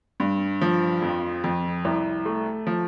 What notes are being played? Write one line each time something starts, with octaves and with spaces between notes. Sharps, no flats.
G2
F3
F2
F2
C2
A3
F3